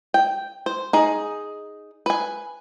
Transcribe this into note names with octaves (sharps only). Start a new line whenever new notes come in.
G5
C5
D#4 G#4
B4 G#5